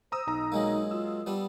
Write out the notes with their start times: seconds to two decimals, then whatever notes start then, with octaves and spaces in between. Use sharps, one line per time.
0.12 C5 A#5 D#6 E6
0.27 B1 D#4 A#5
0.52 F#3 G#3 A#3
0.91 F4 E6
1.26 G3 B3 D4